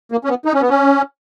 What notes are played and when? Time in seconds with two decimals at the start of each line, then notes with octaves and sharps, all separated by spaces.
0.12 A#3
0.24 C#4
0.30 B3
0.45 D#4
0.54 C#4
0.61 B3
0.69 C#4